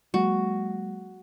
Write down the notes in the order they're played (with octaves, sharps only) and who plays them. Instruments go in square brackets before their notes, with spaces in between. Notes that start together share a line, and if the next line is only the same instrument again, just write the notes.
[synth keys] F#3 G#3 A#3 [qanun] F#4